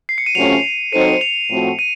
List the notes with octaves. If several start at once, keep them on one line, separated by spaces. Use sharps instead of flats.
C7
C#7
D#7
C3 F#3 A3 C#4 F4 F7
F#3 C4 D#4 A4 C5 D#7
C#7
D#7
F7
A2 F3 A3 C4 F#4
D#7